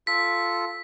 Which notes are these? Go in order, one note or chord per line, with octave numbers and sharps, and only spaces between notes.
F4 A4 B6